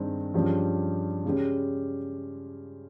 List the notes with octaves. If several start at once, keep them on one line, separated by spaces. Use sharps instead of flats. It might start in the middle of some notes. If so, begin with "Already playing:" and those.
Already playing: G2 D#3 G#3 C4
G2 F3 G#3 C#4 G4
C#3 G#3 C#4 G4